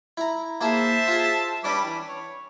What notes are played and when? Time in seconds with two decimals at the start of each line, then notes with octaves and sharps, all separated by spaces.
0.17 E4 A#5
0.61 A#3 E4 G#4 C5 E5 A5
1.08 F4 G#4
1.64 G3 C#4 D4 B4 D6
1.84 E3
2.07 C#5